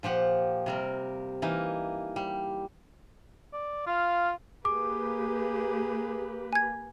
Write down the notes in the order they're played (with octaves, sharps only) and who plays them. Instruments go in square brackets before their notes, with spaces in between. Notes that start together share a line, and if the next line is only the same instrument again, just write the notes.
[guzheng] A#2 F3 G4 F#5
C3 G3 A#4
E3 A#3 D#4
G3
[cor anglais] D5
[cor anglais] F4 [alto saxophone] F5
[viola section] A#3 G4 B4 [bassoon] G#4 [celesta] D6
[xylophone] G#5 G#6